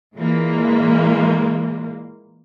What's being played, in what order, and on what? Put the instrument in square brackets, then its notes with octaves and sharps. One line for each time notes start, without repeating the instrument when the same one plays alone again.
[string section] A#2 E3 G#3 A#3